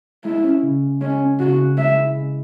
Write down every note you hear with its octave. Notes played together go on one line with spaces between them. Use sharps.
G#3 E4
C#4
C#3
C#3
G#3 C#4
C#4
C#3 F#4
C#3
G#3 E5
E4
C#3